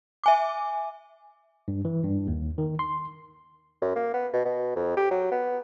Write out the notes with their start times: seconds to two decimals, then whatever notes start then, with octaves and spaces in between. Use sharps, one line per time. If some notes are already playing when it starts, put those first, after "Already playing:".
0.24 E5 G#5 D6
1.68 G2
1.85 E3
2.04 G2
2.28 D#2
2.58 D#3
2.79 C6
3.82 F#2
3.96 A#3
4.14 B3
4.33 B2
4.45 B2
4.76 F2
4.97 G4
5.11 F#3
5.31 B3